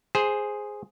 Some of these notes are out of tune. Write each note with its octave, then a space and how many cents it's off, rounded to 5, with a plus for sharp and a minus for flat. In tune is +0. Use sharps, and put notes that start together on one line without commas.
G#4 +0 C5 +0